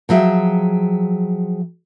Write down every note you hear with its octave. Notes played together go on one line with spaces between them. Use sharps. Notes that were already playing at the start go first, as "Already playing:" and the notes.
F3 F#3 G#4 E5 G5